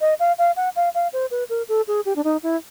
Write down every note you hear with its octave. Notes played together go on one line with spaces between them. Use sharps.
D#5
F5
F5
F#5
F5
F5
C5
B4
A#4
A4
G#4
G4
D4
D#4
E4